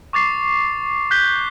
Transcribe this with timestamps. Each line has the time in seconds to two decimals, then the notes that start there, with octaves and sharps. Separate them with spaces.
0.13 C#6 D6 A6 C7
1.11 F#6 G6 B6 G7